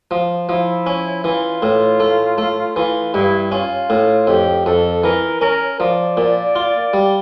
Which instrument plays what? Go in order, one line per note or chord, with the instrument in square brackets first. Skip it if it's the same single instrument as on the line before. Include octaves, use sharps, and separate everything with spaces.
[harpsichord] F3
[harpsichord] F3 [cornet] E4
[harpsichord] C#4
[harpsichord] E3 [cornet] F4
[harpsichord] A2
A3
A3
[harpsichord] E3 [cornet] F4
[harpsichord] G2 [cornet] E4
[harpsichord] C#4 [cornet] F4
[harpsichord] A2
[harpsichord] F2 [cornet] G4
[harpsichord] F2 [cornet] A4
[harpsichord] E3 [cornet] A#4
[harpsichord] C#4 [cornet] A#4
[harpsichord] F3 [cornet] D5
[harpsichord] A#2
F4
G3